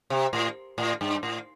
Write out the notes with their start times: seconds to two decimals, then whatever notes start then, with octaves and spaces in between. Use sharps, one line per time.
0.10 C3
0.33 A2
0.78 A2
1.01 G2
1.23 A2